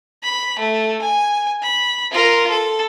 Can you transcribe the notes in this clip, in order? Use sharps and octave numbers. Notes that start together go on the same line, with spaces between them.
B5
A3
G#5
B5
F4 A#4
A4